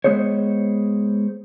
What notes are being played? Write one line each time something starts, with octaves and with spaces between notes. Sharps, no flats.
G#3 B3 G#4 C5 C#5